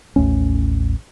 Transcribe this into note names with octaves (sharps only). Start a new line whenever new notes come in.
A1 D#2 A3 C#4